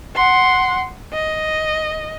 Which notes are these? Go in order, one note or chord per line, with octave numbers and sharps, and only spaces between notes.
F#5 C6
D#5